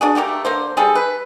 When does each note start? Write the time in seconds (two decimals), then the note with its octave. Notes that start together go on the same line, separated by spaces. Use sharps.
0.01 D4 F#4 G#4
0.15 A3 A#3 G4 A#4
0.45 D3 A#3 C5
0.77 G3 G#4 A4
0.95 B4